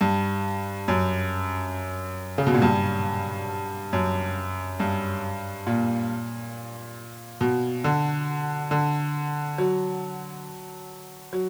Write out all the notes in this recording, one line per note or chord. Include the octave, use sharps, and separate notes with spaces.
G2
F#2
C#3
B2
A#2
G2
F#2
G2
A#2
B2
D3
D3
F#3
F#3